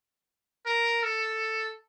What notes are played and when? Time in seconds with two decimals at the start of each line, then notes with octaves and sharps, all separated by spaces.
0.66 A#4
1.03 A4